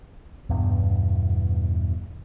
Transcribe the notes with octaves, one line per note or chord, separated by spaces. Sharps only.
E2 G2 B2